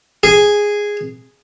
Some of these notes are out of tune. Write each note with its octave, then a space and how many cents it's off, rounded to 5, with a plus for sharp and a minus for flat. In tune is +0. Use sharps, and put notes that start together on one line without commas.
G#4 -5